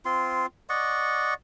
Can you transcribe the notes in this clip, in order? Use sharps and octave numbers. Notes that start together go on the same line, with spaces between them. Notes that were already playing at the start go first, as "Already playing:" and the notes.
C4 F4 C6
D5 D#5 F#5 C#6